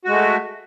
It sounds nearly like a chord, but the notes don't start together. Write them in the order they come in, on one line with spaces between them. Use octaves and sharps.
F#4 G#3 A3